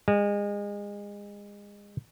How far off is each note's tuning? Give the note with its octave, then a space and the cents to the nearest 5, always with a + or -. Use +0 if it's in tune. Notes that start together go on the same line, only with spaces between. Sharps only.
G#3 -30